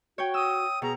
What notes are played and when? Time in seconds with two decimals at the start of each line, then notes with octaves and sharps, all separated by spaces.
0.18 F#4 C#5 G5
0.34 D#6 E6
0.82 B2 G#4 A#5